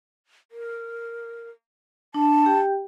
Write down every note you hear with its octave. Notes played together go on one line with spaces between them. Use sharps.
A#4
D4 A5
G4 G5